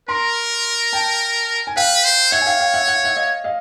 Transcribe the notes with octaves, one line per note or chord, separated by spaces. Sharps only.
A#4 A#5 C6
G5 A5
G#5
B4 F5 G5
C5
C#5 E5 F#5
G#5
F5 G5
F5 G5
E5 F#5
F#5
F5
E5 F#5
D#5 F5
D#5 F5